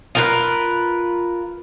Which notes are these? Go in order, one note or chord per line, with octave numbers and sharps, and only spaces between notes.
F4 A#4 B4